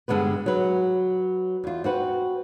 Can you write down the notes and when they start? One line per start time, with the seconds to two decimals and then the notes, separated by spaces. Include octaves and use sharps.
0.08 G2 D3 G#3 B3 B4
0.46 F#3 B4
1.64 E2 F4
1.84 C4 F#4 B4